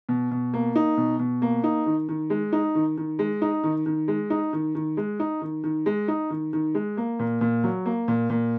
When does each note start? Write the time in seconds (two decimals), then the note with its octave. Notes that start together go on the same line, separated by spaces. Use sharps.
0.09 B2
0.31 B2
0.54 A#3
0.76 D#4
0.97 B2
1.19 B2
1.42 A#3
1.64 D#4
1.86 D#3
2.09 D#3
2.30 G#3
2.53 D#4
2.75 D#3
2.97 D#3
3.19 G#3
3.42 D#4
3.63 D#3
3.86 D#3
4.08 G#3
4.30 D#4
4.53 D#3
4.75 D#3
4.97 G#3
5.20 D#4
5.41 D#3
5.64 D#3
5.86 G#3
6.08 D#4
6.30 D#3
6.53 D#3
6.75 G#3
6.97 A#3
7.19 A#2
7.41 A#2
7.64 F#3
7.85 A#3
8.08 A#2
8.30 A#2